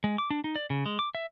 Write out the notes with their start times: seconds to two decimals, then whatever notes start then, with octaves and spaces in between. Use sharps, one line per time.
0.04 G#3
0.18 D6
0.30 D4
0.44 D#4
0.56 D5
0.70 C#3
0.86 G#3
0.99 D6
1.15 E5